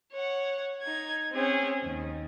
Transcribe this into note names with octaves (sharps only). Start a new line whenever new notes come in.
C#5 F#5
D#4 G#6
C4 C#4 G#4
D#2